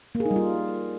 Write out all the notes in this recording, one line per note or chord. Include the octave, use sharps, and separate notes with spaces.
A#3
G#4
D#4
G3
F4